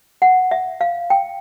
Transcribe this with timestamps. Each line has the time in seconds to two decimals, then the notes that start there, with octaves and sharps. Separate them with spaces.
0.22 F#5
0.51 E5
0.81 F5
1.10 G5